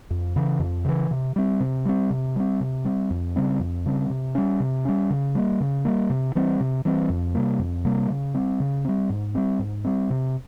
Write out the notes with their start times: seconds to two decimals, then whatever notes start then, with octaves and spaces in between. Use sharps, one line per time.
0.11 F2
0.36 C#3 E3
0.60 F2
0.85 C#3 E3
1.11 C3
1.36 G3 C4
1.60 C3
1.86 G3 C4
2.10 C3
2.36 G3 C4
2.60 C3
2.85 G3 C4
3.10 F2
3.36 C#3 G3 C4
3.60 F2
3.86 C#3 G3 C4
4.10 C3
4.35 G3 C#4
4.60 C3
4.85 G3 C#4
5.10 C#3
5.35 G3 A#3
5.61 C#3
5.85 G3 A#3
6.10 C3
6.35 E3 G3 C4
6.60 C3
6.85 E3 G3 C4
7.09 F2
7.35 C3 G3 A#3
7.59 F2
7.85 C3 G3 A#3
8.10 C#3
8.34 G3 C4
8.60 C#3
8.85 G3 C4
9.10 G#2
9.35 G3 C4
9.59 G#2
9.85 G3 C4
10.10 C3